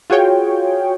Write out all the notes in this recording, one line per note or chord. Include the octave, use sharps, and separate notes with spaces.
F4 F#4 G#4 C#5 G5